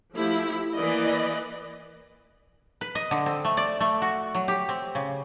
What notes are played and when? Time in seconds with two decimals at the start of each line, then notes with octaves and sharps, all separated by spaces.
0.13 F3 A3 E4 G4
0.74 E3 A#3 B4 D5 D#5
2.81 B4
2.95 D#5
3.11 D3
3.26 C4
3.45 A3
3.57 D5
3.80 A3
4.02 F#4
4.35 F#3
4.48 G4
4.69 C4
4.95 C#3